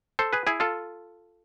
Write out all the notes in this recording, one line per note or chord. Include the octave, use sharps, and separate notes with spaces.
A4 C5
G#4 B4
E4 G#4
F4 A4